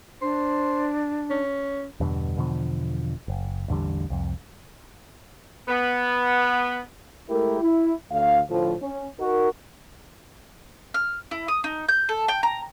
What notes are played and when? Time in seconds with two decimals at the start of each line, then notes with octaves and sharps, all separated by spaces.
0.22 D4 C5
1.30 C#4
2.00 E2 G2 B2 D3
2.37 E2 B2 D3 F3
3.28 F#1
3.68 A1 E2 D3 G3
4.10 C2 F2
5.68 B3
7.30 G#3 A3 E4 G4 A#4
7.61 E4
8.11 D2 F5
8.49 D2 A2 F3
8.82 C#4
9.19 D#4 F#4 A#4
10.94 F6
11.31 E4
11.48 D#6
11.64 D#4
11.89 G6
12.09 A4
12.28 G5
12.43 A#5